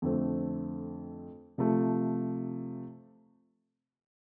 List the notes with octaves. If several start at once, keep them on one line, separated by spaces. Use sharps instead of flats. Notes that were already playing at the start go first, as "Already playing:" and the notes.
F2 D3 A3 C4
C3 F3 A3